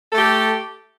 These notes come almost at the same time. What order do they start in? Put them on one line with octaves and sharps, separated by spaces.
A4 A3 G4